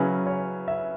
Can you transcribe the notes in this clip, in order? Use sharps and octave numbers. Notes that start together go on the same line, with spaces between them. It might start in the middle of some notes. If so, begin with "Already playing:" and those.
Already playing: C#3 F#3 C#4 E4 B4
C#5
E5